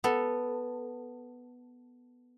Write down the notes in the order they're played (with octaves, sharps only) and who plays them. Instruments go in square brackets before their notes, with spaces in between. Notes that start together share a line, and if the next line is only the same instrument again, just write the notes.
[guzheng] B3 A4